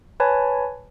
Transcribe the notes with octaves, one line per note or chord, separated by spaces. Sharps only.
B4 C#5 G#5 A5 B5